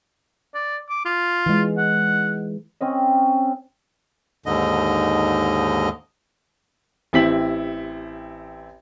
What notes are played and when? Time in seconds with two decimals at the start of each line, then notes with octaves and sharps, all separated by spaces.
0.55 D5
0.90 D6
1.05 F4
1.46 E3 G#3
1.78 F#5
2.81 C4 C#4 D#5
4.46 D#2 G#2 D3 D#5
7.13 A1 C4 E4 G4 B6 F#7